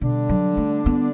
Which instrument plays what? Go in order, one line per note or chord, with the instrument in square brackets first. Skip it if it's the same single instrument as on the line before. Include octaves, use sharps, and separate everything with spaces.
[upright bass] B2 [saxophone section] D3 G3 D4
[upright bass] F#3
A3
B3